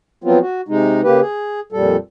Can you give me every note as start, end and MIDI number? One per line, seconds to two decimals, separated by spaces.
0.24 0.39 53
0.24 0.39 54
0.24 0.39 59
0.24 0.39 60
0.24 0.39 65
0.40 0.61 66
0.68 1.01 48
0.68 1.01 56
0.68 1.01 63
1.03 1.20 49
1.03 1.20 58
1.03 1.20 67
1.03 1.20 71
1.21 1.60 68
1.72 1.96 41
1.72 1.96 46
1.72 1.96 55
1.72 1.96 69